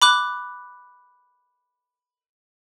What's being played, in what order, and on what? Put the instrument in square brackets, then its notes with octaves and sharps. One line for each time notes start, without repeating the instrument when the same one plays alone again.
[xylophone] B5 D6 F#6